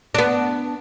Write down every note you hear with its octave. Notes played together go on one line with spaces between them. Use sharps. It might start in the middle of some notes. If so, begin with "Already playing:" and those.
B3 D4